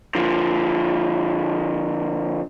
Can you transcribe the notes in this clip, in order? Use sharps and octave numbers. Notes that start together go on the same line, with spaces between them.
D3 F3